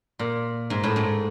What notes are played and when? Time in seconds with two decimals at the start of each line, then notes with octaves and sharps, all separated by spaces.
0.19 A#2
0.70 G#2
0.83 A2
0.96 G#2